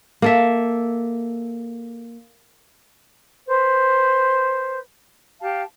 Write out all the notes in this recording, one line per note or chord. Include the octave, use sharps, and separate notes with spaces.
A#3 A4 E5
B4 C5
G4 F5 A5